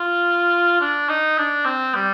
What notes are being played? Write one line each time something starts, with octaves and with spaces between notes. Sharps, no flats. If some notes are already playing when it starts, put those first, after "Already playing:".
Already playing: F4
D4
D#4
D4
C4
G3